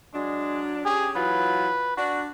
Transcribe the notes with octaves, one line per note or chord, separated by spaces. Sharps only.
F#3 G#3 D4
C#4 G4 G#4
E3 F#3 F4 B4
D4 F#4